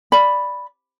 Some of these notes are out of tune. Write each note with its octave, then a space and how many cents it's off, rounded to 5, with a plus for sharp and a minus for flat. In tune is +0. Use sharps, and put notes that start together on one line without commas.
D5 +0 B5 +0